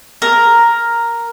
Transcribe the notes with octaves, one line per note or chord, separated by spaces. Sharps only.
A#4